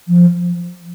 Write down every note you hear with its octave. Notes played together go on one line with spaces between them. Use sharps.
F3